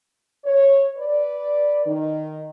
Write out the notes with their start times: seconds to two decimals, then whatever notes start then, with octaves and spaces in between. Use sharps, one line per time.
0.44 C#5
0.97 B4 D5
1.85 D#3